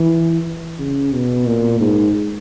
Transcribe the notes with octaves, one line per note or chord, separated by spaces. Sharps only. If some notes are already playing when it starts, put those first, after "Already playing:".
Already playing: E3
C#3
B2
A#2
G#2